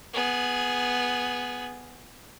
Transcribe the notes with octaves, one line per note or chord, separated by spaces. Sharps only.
B3 G#4